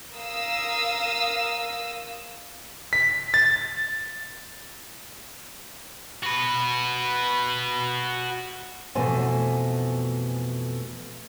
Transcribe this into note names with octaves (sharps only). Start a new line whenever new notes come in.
A#4 F5 D#6 E6
B6
A6
F#4 B4
F2 B2 E3 A3 C5 G#5